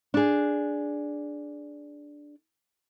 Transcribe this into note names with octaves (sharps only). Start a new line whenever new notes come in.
D4 G#4